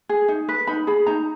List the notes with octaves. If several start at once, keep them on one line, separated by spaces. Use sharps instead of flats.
G#4
D#4
B4
D#4 B5
G#4 B5
D#4 A#5